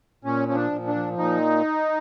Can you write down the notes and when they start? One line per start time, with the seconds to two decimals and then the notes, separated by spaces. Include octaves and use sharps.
0.24 A#2 C#4
0.48 F3 C#4
0.55 D4
0.71 A#2
0.87 D4
0.95 F3
1.18 A#2 D#4